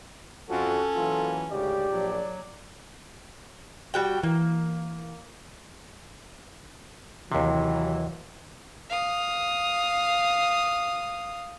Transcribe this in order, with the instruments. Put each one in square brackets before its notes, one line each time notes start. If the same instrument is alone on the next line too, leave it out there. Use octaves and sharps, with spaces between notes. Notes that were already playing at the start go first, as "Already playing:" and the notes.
[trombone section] F2 F3 [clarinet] C#4 [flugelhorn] F#4 [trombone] A4
[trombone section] E3 F#3 A#3 [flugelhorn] F4
[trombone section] D2 G#2 C#3 [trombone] G4 [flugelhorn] D5
[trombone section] A#1 [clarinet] F#3
[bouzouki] G3 F#4 G5
[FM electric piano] E3 [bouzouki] A#3
[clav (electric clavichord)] D#2 C3 [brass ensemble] E3 F#3
[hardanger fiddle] F5 D#6